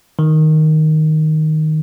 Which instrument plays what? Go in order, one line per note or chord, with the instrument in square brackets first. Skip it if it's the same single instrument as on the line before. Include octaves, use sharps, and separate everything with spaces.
[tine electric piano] D#3